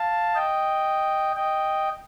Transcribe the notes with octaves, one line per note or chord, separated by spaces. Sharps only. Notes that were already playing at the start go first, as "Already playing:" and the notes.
Already playing: F5 A5
D#5 G5
D#5 G5